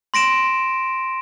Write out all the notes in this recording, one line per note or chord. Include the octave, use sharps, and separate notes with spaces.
C6 A#6 D7 E7